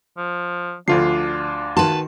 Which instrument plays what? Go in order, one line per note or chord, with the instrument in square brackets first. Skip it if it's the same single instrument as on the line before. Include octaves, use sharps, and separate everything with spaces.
[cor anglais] F3
[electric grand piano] D2 F4 C7 [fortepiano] D3 F3 [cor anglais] D4
[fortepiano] D#3 F#4 C6 [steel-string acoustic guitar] B4 A5